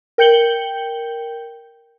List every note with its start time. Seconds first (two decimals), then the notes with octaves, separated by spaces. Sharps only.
0.18 A#4 G5 G6 C#7 F#7 G7